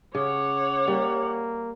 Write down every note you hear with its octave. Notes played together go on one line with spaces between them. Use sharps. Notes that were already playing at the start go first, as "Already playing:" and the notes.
C#3 C#5 F#5 D6
G3 A#3